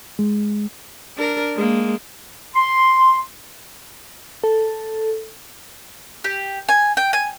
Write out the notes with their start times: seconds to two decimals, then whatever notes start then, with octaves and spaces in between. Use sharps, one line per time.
0.19 G#3
1.17 D4 A#4
1.56 G#3 A#3
2.55 C6
4.44 A4
6.24 G4
6.69 G#5
6.97 G5
7.13 G#5